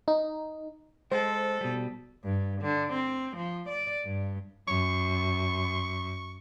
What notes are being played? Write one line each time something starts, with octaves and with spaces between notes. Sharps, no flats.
D#4
G#3 A4 C5
B2 G3
G2
D3
C4
F3
D5
G2
F#2 C#6